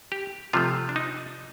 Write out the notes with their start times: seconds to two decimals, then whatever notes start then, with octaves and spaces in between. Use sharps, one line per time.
0.12 G4
0.53 C3 F3 A3 F4
0.89 D4
0.96 D#4